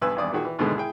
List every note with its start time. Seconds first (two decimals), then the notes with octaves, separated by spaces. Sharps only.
0.02 B1 G2 B2 B4 G#5 E6
0.16 G#1 E2 G2 D5 D#6
0.32 A#2 D#3 F#4 G#4 C#6
0.45 E3
0.59 D#2 G#2 B2 D3 E3 G#3
0.77 E4 G#4 G5